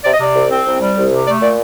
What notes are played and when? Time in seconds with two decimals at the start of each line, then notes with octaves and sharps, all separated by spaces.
0.05 C3 D5
0.14 D#5
0.20 C3 D5
0.36 C2
0.51 C4
0.66 C2
0.81 G3
0.97 C2
1.12 C3
1.27 A3 D5
1.42 A#2 D5